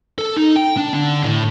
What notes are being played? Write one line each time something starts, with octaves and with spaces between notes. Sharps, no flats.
A4
D#4
G5
D4
D3
A2